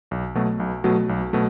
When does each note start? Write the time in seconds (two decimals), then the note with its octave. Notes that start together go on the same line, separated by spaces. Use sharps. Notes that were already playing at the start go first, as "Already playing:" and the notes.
0.11 B1
0.35 B2 F#3 A3
0.60 B1
0.84 B2 F#3 A3
1.09 B1
1.33 B2 F#3 A3